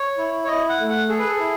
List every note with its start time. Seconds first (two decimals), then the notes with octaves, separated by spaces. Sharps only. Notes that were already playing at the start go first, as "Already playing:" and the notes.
Already playing: C#5
0.18 E4
0.44 C#5
0.48 E4 D#5
0.69 F#5
0.79 A3
0.89 F#5
1.09 G#4 A4
1.19 B4
1.27 A4
1.39 E4